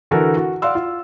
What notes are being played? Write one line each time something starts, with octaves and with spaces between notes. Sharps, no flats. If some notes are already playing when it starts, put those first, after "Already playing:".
D3 E3 F#4 A4 A#4
F#4
D5 F5 F#5 C6 E6
F4